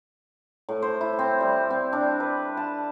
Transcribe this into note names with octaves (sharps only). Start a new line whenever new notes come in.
A2
C5
E4
C4
G3
C4
D4
B4
A5